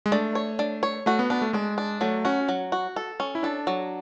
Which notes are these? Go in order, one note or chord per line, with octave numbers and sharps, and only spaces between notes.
G#3
A3 D4
C#5
D4
C#5
A3 F#4
B3
B3 D4
A3
G#3 D4
D4
F#3 A3
C#4 F#4
F#3
F#4
A4
C#4
E4
D4 A4
F#3